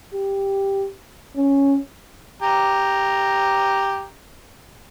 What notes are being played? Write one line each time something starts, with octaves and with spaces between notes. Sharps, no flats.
G4
C#4
G4 A#5